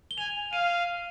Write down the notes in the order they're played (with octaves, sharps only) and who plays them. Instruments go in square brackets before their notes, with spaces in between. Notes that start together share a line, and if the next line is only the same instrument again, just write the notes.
[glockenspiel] G7
[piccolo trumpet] G#5 [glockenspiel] F7
[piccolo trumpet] F5 [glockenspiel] D#7